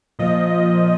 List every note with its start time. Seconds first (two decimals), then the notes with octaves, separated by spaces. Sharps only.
0.19 A#2 F3 D#5